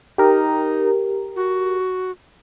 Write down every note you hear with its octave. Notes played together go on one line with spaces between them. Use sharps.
D#4 G4 A#4
F#4